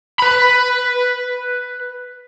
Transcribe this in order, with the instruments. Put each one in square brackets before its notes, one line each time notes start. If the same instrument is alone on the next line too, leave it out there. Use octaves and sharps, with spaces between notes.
[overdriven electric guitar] B4 B5